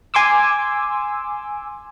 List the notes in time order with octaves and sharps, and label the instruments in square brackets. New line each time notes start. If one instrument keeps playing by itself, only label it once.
[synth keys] G#5 C6 D6 E6